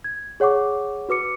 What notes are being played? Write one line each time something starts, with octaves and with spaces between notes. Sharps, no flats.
G#6
G#4 C#5 F#5 C#6 D6
F#4 B4 D6 C#7